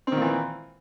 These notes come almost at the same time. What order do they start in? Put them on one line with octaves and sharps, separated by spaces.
C4 D#3 A#2 E3